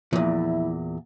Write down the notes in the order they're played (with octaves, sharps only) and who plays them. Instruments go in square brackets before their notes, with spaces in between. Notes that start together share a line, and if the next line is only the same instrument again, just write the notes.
[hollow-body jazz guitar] E2 A#2 [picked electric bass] F3 [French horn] E4